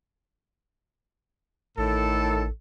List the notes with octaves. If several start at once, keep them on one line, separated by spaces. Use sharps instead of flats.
A1 A2 D#3 A4